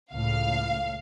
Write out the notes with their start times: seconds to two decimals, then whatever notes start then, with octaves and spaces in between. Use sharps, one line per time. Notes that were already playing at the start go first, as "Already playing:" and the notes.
0.13 C#2 A2 F5